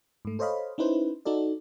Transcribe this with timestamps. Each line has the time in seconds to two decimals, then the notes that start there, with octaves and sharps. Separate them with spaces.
0.25 G#2 A3
0.39 A4 C5 C#5 D#5 F5 B5
0.78 C#4 D#4 E4 B4 C5
1.25 D#4 F#4 A4 D5